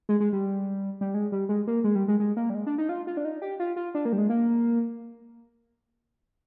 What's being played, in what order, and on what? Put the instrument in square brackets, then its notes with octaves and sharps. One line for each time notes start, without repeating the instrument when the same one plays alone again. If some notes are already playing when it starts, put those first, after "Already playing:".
[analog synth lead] G#3
G#3
G3
G3
G#3
G3
G#3
A#3
G#3
G3
G#3
G#3
A#3
G3
G#3
D4
D#4
F4
F4
D4
D#4
G4
F4
F4
D4
A#3
G3
G#3
A#3